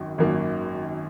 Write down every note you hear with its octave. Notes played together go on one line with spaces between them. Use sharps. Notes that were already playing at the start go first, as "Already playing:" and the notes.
Already playing: G#1 F#2 D#3
G#1 F#2 D#3 A#3